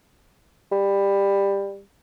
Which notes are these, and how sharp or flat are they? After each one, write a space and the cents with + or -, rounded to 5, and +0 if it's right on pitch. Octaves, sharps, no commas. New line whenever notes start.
G3 +15